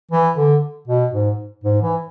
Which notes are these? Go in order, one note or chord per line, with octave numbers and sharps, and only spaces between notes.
E3
D3
B2
G#2
G#2
E3